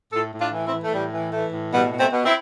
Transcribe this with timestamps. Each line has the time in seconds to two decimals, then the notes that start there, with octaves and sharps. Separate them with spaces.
0.13 A2 F4 A4
0.33 A2
0.39 D4 F4
0.53 E3
0.66 C4 E4
0.72 E3
0.82 A3
0.92 A2 G3
1.13 E3
1.32 E3 A3
1.52 A2
1.72 B2 G3 B3
1.92 B2
1.99 A3 C4
2.11 B2
2.25 C4 E4